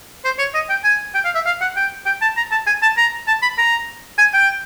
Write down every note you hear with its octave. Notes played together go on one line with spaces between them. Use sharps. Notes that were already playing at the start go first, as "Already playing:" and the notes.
C5
C#5
D#5
G5
G#5
G5
F5
E5
F5
F#5
G5
G5
A5
A#5
A5
G#5
A5
A#5
A5
B5
A#5
G#5
G5